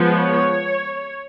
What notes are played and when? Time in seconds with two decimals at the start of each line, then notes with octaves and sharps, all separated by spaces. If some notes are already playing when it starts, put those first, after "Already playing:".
Already playing: F3 G#3 B3
0.16 C#5